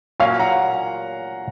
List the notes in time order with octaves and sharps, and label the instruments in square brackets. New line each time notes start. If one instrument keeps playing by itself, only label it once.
[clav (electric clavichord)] A#2 F#3 A#3 C#4 [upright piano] F5 G#5
[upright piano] F#5 A#5